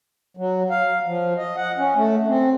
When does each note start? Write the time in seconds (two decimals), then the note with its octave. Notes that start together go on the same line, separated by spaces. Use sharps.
0.37 F#3
0.70 F5
1.06 F3
1.37 D#5
1.56 F#5
1.78 C#4
1.96 A3
2.28 C4